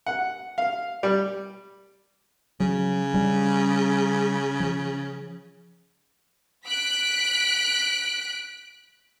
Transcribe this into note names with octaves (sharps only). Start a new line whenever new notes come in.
F#5
F5
G3
C#3 F#3
G3 C#4
F3
F#6 B6 D7